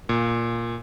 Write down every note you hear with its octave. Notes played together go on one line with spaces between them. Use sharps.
A#2